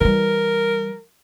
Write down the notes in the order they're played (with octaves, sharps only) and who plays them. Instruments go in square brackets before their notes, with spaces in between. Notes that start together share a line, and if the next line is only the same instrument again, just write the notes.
[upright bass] E3 G3 [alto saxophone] A#4